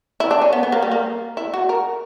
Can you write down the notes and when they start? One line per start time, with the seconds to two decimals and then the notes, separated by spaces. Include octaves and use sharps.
0.20 E4
0.31 D4
0.42 C#4
0.53 B3
0.63 B3
0.72 A#3
0.82 G3
0.91 A#3
1.37 E4
1.54 F#4
1.69 A#4